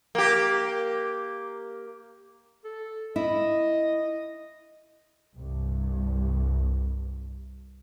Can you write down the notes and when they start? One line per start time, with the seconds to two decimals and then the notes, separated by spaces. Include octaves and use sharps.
0.15 A#3 G4
2.64 A4
3.16 E4 D#5
5.35 C2 G2